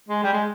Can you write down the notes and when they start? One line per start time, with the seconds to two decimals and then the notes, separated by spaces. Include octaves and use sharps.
0.09 G#3
0.24 G3
0.33 G#3